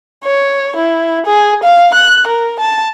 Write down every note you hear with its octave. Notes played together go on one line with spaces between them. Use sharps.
C#5
E4
G#4
F5
F#6
A#4
A5